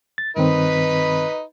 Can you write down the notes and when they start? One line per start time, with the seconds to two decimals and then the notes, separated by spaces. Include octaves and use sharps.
0.18 A6
0.36 G2 D#3 C4 D#4 B4 B5